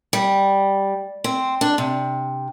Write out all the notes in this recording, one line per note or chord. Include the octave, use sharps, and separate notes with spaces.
G3
C4
D4
C3